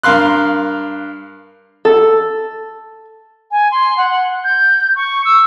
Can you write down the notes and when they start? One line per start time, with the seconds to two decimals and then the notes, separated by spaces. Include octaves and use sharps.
0.03 G2 A#4 F5 C6 F#6
1.85 A4
3.51 G#5
3.72 C6
3.97 F#5
4.44 G6
4.96 C#6
5.25 E6